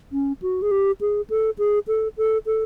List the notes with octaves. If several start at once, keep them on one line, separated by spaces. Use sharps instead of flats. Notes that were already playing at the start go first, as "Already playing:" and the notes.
C#4
F#4
G#4
G4
G#4
A4
G#4
A4
A4
A4